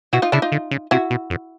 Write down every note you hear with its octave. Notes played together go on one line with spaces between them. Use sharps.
B2 E4 F#4
D#4 F4
C#3 D4 E4
D#4 F4
D3
C#3
C3 E4 F#4
B2
F2